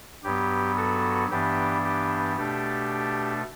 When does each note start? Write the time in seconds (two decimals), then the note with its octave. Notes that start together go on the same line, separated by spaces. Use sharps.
0.24 G2 F#3 B3 G4
0.76 F#4 A4
1.30 G2 E3 B3 D4 G4
1.84 G4
2.37 B2 A3 D4 G4